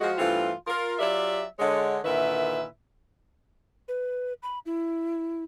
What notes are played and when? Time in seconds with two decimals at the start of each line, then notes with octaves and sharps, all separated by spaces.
0.01 F3 G#3 F#4
0.18 G2 E3 A3 C4 F4
0.67 F4 A#4
0.99 F#3 F4 G4 D5 E5
1.59 D3 G#3 C#5
2.04 A#2 D3 D#3 E4 B4 E5
3.88 B4
4.43 B5
4.66 E4